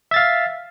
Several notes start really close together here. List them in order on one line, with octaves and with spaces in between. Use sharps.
E5 A6 F5